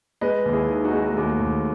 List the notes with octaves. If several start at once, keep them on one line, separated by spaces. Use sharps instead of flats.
G#3 B4 D#5
D#2
E4 G#4
D#3
D#4 F#4
G#3
A3
D#2 G#3
D#2